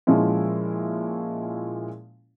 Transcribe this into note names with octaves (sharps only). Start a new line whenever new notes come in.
A#2 F3 G#3 C#4 E4